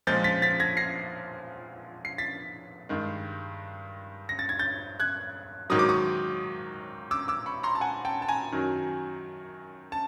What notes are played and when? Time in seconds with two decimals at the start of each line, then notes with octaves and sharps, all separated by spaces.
0.07 A#2 F3 G#3 G6 A6
0.24 A6 B6
0.42 A6 B6
0.60 G#6 A#6
0.77 A#6 C7
2.05 C7
2.18 A6 B6
2.89 G2 D#3 G#3
4.29 A#6
4.39 A6
4.49 G#6
4.59 G6 A6
5.00 F#6 G#6
5.70 G#2 D#3 F#3 D#6
5.79 D6
5.89 C#6 D#6
7.11 D6 E6
7.28 D6 E6
7.46 B5 C#6
7.63 A#5 C6
7.75 A5
7.81 F#5 G#5
8.05 G5 A5
8.22 A5
8.28 G#5 A#5
8.52 F#2 D#3 F#3
9.92 A5